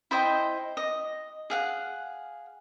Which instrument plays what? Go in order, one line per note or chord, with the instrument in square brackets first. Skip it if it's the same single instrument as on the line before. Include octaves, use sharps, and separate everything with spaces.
[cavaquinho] E4 C5 D#5 G5
D#5
G#4 F5 F#5